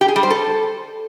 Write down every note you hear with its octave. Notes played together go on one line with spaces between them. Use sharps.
G4
G#4
G3
C5
A4